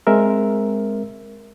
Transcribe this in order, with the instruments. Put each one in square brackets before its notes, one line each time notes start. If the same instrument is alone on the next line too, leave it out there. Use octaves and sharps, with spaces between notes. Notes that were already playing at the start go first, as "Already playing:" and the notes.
[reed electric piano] G#3 C4 A#4 E5